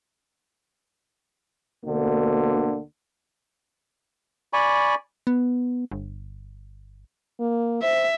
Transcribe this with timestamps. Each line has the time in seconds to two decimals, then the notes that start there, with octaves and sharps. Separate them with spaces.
1.85 D2 B2 D3 A#3
4.53 D5 G#5 B5 C#6
5.27 B3
5.92 G1
7.40 A#3
7.83 C5 E5